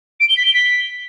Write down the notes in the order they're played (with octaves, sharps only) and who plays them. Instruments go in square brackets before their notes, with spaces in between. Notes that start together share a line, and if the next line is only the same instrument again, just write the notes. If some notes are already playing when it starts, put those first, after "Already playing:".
[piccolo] D7
G7
B6
G7
B6